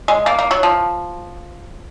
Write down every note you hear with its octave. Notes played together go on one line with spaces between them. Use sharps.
G#3
A#3
A#3
F#3
F3